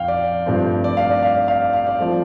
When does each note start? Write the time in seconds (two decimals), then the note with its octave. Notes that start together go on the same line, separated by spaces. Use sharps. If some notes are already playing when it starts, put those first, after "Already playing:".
Already playing: F2 F5 G5
0.08 D5
0.46 G2 F3 A3 C4
0.84 D5
0.97 F5
1.10 D5
1.23 F5
1.35 D5
1.48 F5
1.61 D5
1.73 F5
1.87 D5
1.98 F3 A3 C4